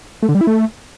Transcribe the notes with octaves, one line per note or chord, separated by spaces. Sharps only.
A3
D3
G3
E4
A3